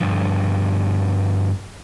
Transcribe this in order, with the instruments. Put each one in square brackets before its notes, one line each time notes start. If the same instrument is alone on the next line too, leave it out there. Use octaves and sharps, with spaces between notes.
[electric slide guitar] G2 D3 F3